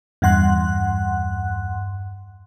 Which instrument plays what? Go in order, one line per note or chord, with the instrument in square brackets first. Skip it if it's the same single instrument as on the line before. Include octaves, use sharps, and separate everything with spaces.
[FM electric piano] E2 G2 F#5 C6 F#6